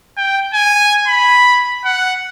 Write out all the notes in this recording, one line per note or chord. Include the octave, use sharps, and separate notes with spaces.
G5
G#5
B5
F#5